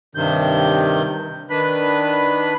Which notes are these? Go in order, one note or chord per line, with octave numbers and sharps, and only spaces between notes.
G2 C3 D#3 G6
D#3 D4 B4 B5